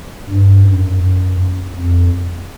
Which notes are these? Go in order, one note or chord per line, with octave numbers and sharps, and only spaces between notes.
G2
F#2
F#2
F2